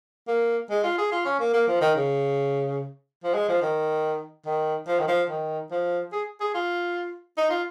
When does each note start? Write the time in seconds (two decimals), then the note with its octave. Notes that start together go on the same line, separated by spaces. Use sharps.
0.28 A#3
0.70 G#3
0.83 F4
0.98 G#4
1.11 F4
1.25 C#4
1.40 A#3
1.54 A#3
1.67 F3
1.81 D#3
1.95 C#3
3.24 F3
3.34 G#3
3.48 F3
3.62 D#3
4.45 D#3
4.87 F3
4.99 D#3
5.08 F3
5.29 D#3
5.71 F3
6.12 G#4
6.40 G#4
6.54 F4
7.37 D#4
7.50 F4